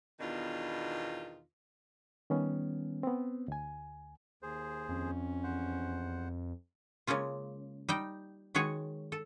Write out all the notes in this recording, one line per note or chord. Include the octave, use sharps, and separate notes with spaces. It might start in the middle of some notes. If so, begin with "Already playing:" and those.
E2 B2 D#3 D4 F4
D#3 G3 B3 C#4
B3 C4
D2 G#5
D#2 G#4 C5
F2 C#4
E2 C5 F#5
C#3 G#3 A#3 C#4 F4
G3 D#4 G5
D#3 G#3 F#4 G#4 C#5
A4